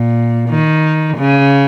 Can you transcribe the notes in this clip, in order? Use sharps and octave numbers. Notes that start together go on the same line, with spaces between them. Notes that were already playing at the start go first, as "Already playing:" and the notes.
Already playing: A#2
D#3
C#3